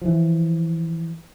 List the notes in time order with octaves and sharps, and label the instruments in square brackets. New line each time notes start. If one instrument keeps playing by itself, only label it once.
[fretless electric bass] E3 F3